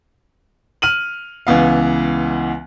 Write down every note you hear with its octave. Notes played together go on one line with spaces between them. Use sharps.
F6 D#7 F#7
C#2 E3 B3 F5